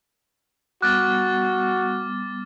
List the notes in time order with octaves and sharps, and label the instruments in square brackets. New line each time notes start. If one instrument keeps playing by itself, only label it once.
[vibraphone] G3 B3 [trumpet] F#4 [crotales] D6 F6 A6 [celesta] F#6